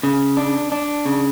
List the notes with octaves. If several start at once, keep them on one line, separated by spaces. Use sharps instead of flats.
C#3
D4
D4
C#3